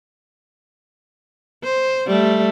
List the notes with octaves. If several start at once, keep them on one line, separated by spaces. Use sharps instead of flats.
C5
G3 A3